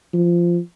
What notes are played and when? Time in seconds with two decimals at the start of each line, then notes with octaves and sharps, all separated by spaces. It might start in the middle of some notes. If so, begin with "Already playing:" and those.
0.14 F3